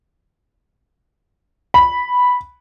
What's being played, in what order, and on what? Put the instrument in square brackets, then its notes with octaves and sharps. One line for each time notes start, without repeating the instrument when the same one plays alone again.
[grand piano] B5